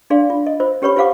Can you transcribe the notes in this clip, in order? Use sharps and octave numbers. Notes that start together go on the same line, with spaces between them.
D4 G#4 D5 F5 C6
F4
D#5
F4 C5
C#4 G4 B4 C#5 B5 C#6
F4 G4 C5 F5 F#5 D6